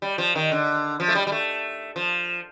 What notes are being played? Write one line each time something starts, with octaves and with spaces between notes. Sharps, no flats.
G3
F3
D#3
D3
F3
A3
G3
G3
A3
F3